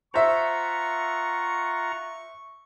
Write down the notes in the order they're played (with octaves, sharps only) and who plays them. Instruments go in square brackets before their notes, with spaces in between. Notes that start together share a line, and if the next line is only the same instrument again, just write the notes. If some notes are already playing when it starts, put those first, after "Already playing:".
[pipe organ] F4 F#5 A#5 [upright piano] C5 E5 [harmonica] C#6